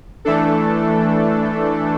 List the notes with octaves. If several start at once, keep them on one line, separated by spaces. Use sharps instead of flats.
E3 A3 D4 A4